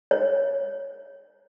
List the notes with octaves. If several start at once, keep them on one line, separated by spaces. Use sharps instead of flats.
C#5